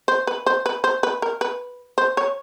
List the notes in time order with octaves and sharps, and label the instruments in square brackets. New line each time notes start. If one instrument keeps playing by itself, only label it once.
[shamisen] C5
B4
C5
B4
C5
B4
A#4
B4
C5
C#5